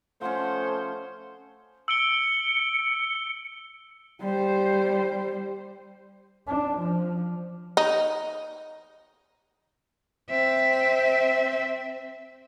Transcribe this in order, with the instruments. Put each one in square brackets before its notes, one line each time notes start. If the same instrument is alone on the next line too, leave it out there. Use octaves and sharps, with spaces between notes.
[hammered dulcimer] F3 C#4 [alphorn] A3 [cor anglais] C5 [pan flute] F#5
[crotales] E6 D7 G7 [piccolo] C#7
[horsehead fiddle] G3 C5
[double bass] D4
F3
[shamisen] D#4
[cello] C4 E5